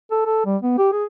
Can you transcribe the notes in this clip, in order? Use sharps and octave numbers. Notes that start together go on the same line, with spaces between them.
A4
A4
G3
B3
G4
G#4